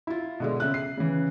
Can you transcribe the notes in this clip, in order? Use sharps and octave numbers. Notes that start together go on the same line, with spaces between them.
E4 F4
B2 D3 G#3
C#3 E5 F#6
C7
C#3 E3